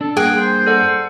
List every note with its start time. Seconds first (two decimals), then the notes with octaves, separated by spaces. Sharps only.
0.01 D4 A4
0.17 G2 A#3 G#4 F#5 G5
0.37 C5
0.67 A4 D5 F#5